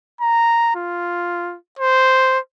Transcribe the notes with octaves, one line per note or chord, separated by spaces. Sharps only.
A#5
F4
C5